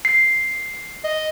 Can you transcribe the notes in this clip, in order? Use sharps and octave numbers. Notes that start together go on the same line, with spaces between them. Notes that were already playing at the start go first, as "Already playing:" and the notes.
C7
D#5